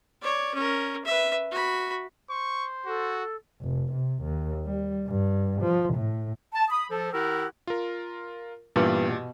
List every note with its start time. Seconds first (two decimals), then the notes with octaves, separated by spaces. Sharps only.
0.22 C#5 D5
0.55 C#4 A#4
1.05 B4 E5
1.51 F#4 B5
2.30 C5 C#6
2.86 F#4 A4
3.62 F1
3.93 C3
4.23 D#2
4.66 G3
5.08 G2
5.62 F3
5.94 A2
6.55 A5
6.70 B5 D#6
6.91 F3 A4
7.13 D#3 E4 G4 A#4 F#5 E6
7.67 F4 A#4
8.76 G2 A#2 E3 B3 G4
9.09 B2